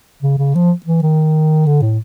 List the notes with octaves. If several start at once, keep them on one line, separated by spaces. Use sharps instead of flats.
C#3
C#3
F3
E3
D#3
D3
A2